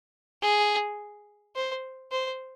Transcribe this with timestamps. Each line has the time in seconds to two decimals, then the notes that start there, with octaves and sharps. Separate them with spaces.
0.42 G#4
1.56 C5
2.12 C5